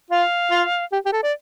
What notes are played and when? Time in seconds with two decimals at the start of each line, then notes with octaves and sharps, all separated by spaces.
0.11 F4 F5
0.51 F4
0.93 G4
1.06 G4
1.13 A4
1.23 D5